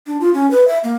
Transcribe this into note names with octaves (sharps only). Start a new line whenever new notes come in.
D4
F4
C#4
B4
E5
A#3